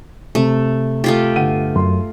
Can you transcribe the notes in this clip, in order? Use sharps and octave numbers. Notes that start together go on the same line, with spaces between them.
C3 A3
A3 F4 G4
G1 F#5 D#7
F#2 C6